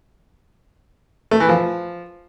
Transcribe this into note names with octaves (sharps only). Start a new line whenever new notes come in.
A3
E3
F3